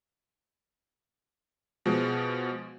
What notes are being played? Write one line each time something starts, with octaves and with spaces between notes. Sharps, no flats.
B2 F3 G#3